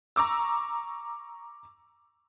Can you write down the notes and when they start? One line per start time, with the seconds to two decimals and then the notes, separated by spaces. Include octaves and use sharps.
0.16 A#5 C#6 D6 E6